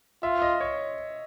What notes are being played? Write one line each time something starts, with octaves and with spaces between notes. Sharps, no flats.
F4 E5
D#5
C#5